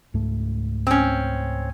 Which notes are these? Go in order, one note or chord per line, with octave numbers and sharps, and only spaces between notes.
C#2 G#2 A3
C4 C#4